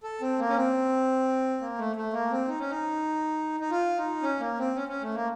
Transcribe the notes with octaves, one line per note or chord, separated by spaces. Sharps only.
A4
C4
A#3
C#4
C4
A#3
A3
A3
A#3
C4
D#4
C#4
D#4
D#4
F4
D#4
C#4
A#3
C4
C#4
C#4
A3
A#3